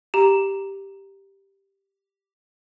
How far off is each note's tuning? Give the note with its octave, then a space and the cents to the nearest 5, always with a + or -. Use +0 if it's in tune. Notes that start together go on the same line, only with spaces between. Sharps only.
G4 +0 A#5 +0